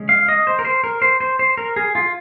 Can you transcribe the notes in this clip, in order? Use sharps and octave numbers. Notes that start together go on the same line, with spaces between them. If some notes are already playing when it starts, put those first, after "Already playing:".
Already playing: C#3 G#3 C#4
F5
D#5
C5
A#4
C5
A#4
C5
C5
C5
A#4
G#4
F4